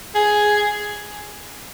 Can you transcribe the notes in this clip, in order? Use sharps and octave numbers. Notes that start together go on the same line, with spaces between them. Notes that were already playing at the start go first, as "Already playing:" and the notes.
G#4